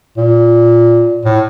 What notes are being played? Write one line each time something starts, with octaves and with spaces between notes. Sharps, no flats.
A#2
A2